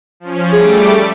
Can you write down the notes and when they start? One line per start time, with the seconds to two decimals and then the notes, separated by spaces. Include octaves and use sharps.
0.20 F3 C#4
0.53 G3 A3 G#4 D6